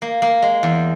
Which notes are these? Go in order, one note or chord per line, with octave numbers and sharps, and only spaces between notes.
A#3
A#3
G#3
E2